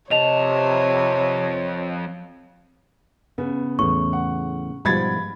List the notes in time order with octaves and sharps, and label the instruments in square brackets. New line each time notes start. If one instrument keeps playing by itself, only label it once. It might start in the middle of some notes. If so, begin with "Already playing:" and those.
[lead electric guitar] F2 A5 [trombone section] C3 [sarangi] C#5 [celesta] D#5 F7
[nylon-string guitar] C#3 [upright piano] B3
[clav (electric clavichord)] E2 A2 [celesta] C#6
[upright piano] F#5
[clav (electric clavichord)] G#2 B2 F3 [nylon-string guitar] G3 F#5 [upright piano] B5 G#6 A6